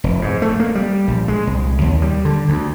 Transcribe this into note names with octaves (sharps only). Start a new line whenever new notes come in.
F1
G#2
A3
A#3
G3
A#1
G#3
C2
D#2
G3
D3
D2